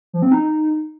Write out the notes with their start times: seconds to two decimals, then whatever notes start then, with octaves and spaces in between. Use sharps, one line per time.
0.13 F3
0.22 C4
0.31 D#4